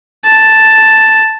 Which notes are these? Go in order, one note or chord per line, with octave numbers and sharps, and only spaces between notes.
A5